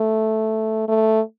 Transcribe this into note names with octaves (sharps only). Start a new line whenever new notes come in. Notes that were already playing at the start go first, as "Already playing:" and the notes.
Already playing: A3
A3